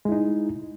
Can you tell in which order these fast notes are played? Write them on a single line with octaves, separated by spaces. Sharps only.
G#3 E4 D#4